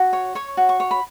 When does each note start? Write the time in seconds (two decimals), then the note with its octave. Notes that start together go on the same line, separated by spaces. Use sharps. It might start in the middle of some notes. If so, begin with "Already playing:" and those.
Already playing: F#4
0.13 C#5
0.35 C#5 C#6
0.57 F#4
0.69 C#6
0.80 C#5
0.91 B5